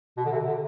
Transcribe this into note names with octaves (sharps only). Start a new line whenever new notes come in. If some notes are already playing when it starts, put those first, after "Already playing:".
B2
D3
C3
D3